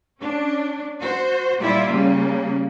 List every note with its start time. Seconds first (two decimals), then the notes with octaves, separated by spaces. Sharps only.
0.20 C#4 D4
1.00 F#4 C5
1.60 A#2 G3 E4 F4 D5 E5
1.89 C#3 G3 A#3